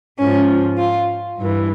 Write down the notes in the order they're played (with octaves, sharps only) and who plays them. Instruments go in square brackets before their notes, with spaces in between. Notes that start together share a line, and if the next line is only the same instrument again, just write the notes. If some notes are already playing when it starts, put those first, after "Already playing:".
[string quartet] G#2 F3 C#4
F4
G2 E3